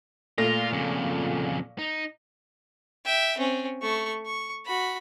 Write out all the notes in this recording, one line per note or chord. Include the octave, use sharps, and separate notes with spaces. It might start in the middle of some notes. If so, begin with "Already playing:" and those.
A#2 A3 F4 A#6
F2 C#3
D#4
E5 G5
C4 C#4
A3 C#6
C#6
F#4 B5